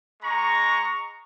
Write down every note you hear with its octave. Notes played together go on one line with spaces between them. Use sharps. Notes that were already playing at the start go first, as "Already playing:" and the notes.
G#3 A#5 C#6